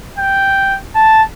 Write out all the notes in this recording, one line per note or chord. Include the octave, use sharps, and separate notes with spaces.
G5
A5